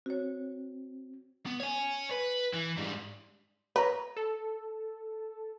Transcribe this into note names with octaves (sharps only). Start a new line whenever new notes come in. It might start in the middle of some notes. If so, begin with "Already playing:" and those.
C4 F#4 C#5
B3
C#5 G#5
B4
E3
G#2 G3
B4 C#5 A#5
A4